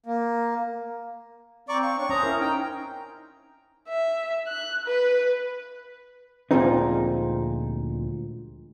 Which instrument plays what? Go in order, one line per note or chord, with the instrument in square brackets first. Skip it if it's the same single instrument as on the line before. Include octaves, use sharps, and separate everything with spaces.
[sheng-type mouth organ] A#3
[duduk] C4 [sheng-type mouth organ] D5 C#6 D6 [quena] A#5
[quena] F5 [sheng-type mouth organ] C#6
[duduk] D4 [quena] C#5 [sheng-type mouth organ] C#6
[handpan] C#4 C5 [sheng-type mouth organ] A#5 [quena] D#6
[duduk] C#4 [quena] E4 [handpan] A#4
[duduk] D#4 [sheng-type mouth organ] G5
[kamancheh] E5
F#6
B4
[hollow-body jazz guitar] D2 A#2 F3 G#3 C4 D#4